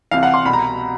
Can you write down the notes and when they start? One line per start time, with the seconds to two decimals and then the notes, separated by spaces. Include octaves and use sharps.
0.11 C2 C3 E3 F5
0.23 F#5
0.34 C6
0.45 C2 B2 B5
0.53 A#5